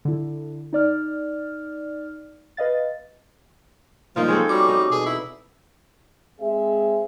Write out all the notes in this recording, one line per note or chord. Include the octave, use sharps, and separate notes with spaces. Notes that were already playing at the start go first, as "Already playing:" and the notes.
D3 E4
D#4 D5 F6
B4 D#5 F5 A6
D3 D#3 F3 G3 A#3 D#4 F4
C#3 G#3 C4 G4 A4 C#5
F2 G3 C#4 F#4 D6
D#4
E2 B2 G#4
E4
G#3 C4 G#4 E5